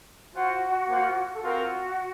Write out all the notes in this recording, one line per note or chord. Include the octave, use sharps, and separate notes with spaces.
F4 F#4 C5 F#5
A#3 F4 C5 F#5
A4
C4 F4 F#4 A#4